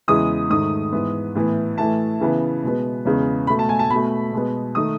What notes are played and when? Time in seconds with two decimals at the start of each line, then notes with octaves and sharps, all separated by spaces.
0.08 E2 C#3 E3 G#3 D#6
0.50 G#2 D#3 A3 D#6
0.92 G#2 E3 B3
1.35 A2 E3 B3
1.78 A2 E3 A3 A5
2.20 C#3 E3 B3
2.63 B2 G#3 B3
3.05 E2 C#3 G#3 B3
3.47 B2 A3 B5
3.59 A5
3.69 G#5
3.79 A5
3.90 B2 A3 B5
4.33 B2 G#3 B3
4.75 D#3 A3 D#6